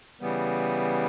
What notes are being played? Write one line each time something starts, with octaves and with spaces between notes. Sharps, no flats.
C#3 E3 G3 B3